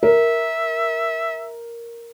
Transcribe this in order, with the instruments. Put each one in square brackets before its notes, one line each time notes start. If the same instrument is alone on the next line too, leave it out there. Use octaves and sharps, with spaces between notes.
[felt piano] A#4 [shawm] E5